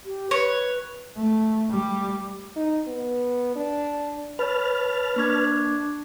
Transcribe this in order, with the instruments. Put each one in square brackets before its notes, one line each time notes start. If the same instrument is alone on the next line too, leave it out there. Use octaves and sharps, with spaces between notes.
[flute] G4
[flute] B4 [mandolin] C#5
[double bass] A3
G3
[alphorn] D#4
B3
D4
[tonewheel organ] B4 A5 F6 [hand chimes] C#5 B5
[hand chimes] A#3 C#6 G#6 [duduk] D4